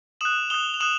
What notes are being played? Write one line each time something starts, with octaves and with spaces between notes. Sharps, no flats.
D#6 F#6 E7 F#7
D#6 F#6 F7 G7
F7
D#6 F#6 E7 F#7